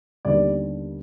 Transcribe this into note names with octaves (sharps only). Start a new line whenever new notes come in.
D#2 D3 G3 B3 D5